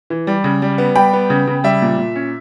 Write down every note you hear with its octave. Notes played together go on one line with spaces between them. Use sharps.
E3
G3
C#3
G3
B3
G3 G5 B5
B3
C#3
C#3
G3 E5
A#2
A#2
C#4